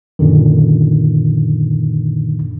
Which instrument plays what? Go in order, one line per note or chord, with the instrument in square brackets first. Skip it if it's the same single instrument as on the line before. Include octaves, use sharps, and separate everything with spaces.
[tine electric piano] F#2 A#2 D3 D#3